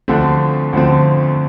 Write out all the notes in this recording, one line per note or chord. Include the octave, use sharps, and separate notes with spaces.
D2 D3 F3 A3 C4
D2 D3 F3 A3 C4